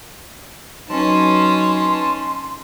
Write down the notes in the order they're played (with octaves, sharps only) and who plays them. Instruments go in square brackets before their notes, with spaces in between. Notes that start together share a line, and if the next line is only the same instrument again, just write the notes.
[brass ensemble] F#3 B4 C#5 [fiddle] C#4 A5 [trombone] D#4 [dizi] C6